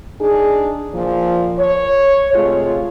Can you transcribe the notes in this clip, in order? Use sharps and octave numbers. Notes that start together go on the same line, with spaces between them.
D4 D#4 G#4
A#2 F3
C#5
C3 G#3 A3 F4